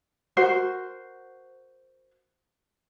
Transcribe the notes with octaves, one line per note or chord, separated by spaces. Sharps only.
F#4 A#4 C5